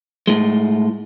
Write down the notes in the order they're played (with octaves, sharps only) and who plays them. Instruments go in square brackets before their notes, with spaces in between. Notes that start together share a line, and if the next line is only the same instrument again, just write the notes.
[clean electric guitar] A2 G#3